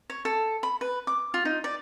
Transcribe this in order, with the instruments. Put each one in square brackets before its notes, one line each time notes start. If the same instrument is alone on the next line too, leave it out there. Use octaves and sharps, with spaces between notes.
[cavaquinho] C#5
A4
B5
B4
D6
F4
D#4
D5